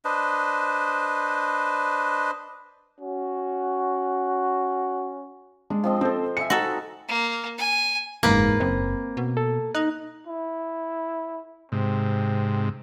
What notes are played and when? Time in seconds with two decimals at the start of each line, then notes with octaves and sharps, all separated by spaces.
0.05 D4 B4 C5 D#5
3.00 C#4 F#4
5.70 G#3 D4
5.84 F3 C4 D#5
6.01 C4 A4 C5
6.37 E5 F5 G#5 C#7
6.50 D#4 F#4 A4 E5
7.08 A#3
7.58 G#5
8.23 F#1 E2 G#2 A#3 B4
8.60 F#1 C4
9.17 B2
9.37 A4
9.75 D#4 F#6
10.27 E4
11.72 G#2 C3 C4